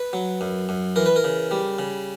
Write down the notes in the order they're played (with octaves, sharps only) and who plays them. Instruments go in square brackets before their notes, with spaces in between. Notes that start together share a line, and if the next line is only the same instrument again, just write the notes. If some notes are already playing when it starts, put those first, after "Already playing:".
Already playing: [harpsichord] B4
F#3
F#2
F#2
E3 A#4
B4
A#4
C#3
G3
C#3